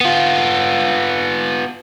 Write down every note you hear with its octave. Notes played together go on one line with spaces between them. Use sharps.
B3 F4